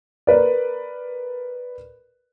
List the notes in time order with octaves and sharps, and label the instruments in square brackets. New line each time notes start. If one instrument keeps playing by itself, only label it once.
[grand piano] A#4 B4 D5